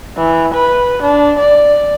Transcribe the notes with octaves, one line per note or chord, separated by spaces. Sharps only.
E3
B4
D4
D5